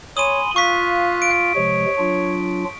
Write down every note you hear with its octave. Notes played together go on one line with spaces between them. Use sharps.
C#5 G#5 B5 C6 D#6 D#7
F4 F5 C#6 F#6 B6
D7
C3 F3 G#3 C#5
F#3 D4 F4